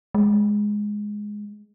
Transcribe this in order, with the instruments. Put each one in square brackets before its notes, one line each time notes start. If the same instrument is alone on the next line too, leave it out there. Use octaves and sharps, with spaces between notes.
[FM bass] G#3